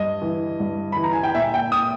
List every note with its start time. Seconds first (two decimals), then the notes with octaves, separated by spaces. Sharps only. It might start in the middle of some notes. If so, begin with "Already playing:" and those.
Already playing: G2 D#5
0.22 E3
0.60 G2
0.92 E3 B5
1.03 A#5
1.13 G#5
1.23 G5
1.35 A#2 E5
1.54 G5
1.72 D#6